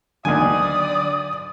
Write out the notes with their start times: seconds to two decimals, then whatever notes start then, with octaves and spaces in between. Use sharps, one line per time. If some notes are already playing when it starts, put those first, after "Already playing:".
0.25 D2 D3 D#3 F#3 D4 D5 G#5 D#6